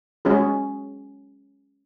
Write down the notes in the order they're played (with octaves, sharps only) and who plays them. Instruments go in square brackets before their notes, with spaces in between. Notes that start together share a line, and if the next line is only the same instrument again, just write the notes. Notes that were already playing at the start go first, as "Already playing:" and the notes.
[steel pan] G#3 C#4 F#4 G#4